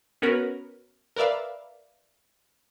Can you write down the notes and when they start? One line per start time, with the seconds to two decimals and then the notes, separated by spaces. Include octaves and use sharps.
0.22 B3 C#4 F#4 A#4 B4
1.16 A#4 B4 D5 E5 F5